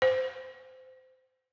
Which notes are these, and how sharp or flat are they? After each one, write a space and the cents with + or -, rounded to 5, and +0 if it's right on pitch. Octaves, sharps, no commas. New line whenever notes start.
C5 -20